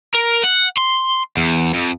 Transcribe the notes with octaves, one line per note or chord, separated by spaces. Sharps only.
A#4
F#5
C6
E2
F2